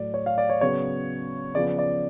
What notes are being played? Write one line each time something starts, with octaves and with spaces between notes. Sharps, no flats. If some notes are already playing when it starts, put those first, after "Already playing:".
Already playing: A2 F#3 A3 D5
C#5
F5
D5
C#5
C#3 F#3 B3 C#5
C#3 F3 B3 D5
D5